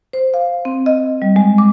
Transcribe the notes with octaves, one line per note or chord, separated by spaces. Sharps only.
C5
F5
C4
D#5
G3
G#3
D6